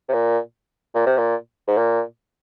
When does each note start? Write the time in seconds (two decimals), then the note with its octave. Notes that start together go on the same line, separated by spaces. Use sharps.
0.08 C3
0.13 A#2
0.95 A#2
1.06 C3
1.18 A#2
1.68 G#2
1.77 A#2